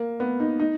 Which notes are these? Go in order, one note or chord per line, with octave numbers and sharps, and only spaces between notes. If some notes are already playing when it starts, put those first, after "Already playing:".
Already playing: A#3
B3
D#4
D#4